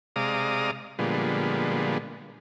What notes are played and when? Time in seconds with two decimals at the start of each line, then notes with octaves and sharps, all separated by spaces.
0.16 C3 G#3 D5 F5 A#5 D#6
0.99 A#2 D3 F3 G3 G#3 B3